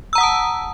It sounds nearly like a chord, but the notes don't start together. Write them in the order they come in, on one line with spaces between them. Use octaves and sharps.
E6 A#5 F#5 D#6 A5